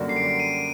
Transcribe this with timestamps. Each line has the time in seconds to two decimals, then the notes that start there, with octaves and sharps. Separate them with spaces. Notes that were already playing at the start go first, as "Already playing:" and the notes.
Already playing: F#2 D3 G3 A#3 F#4
0.09 C7
0.16 D7
0.40 D#7